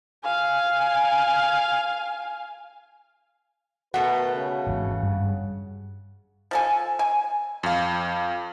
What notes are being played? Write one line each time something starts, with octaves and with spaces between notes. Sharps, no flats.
F5 G#5
B2 A3 F#4 A#4 B4 F#5
C#3
G#1 E2 E3
G2
F3 A4 G#5
G#5
F2 F5